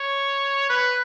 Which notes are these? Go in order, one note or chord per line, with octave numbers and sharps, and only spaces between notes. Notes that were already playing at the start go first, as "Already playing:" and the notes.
Already playing: C#5
B4